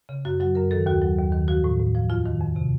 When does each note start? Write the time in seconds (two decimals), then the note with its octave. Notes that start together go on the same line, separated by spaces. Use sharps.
0.09 C#3
0.25 F#2 F#4
0.40 F#3 F#4
0.55 F#2 A#4
0.71 D#3 A4
0.86 D#2 F#4
1.02 F#3
1.18 D#2
1.32 D#3
1.48 F3 F#4
1.64 A2
1.79 A2
1.95 F3
2.10 F2 F4
2.26 D#3
2.41 F2
2.56 C3